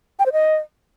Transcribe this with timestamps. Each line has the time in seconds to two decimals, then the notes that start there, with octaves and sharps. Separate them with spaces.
0.19 G5
0.26 C5
0.32 D#5